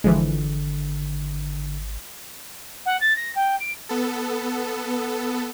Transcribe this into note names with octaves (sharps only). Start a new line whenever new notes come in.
G#1 D3 E3 F3 G#3
F#5
A6
A#6
G5
D7
B3 A4